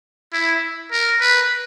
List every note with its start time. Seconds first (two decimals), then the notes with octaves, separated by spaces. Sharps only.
0.33 E4
0.92 A#4
1.20 B4